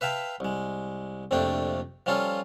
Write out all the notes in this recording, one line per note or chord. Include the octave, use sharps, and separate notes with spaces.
B4 E5 F5 G5 A5
C2 G#3
A#1 F2 C3 A3 D4 G5
F3 G3 C#4 F4 A4